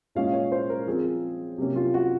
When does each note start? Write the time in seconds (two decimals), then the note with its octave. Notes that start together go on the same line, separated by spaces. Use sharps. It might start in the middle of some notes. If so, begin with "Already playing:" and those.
0.15 A#2 G#3 C#4 F5
0.33 C#5
0.52 C5
0.70 A#4
0.87 F3 C4 G#4
1.58 C3 F#3 A#3 C#4
1.76 F4
1.94 F#4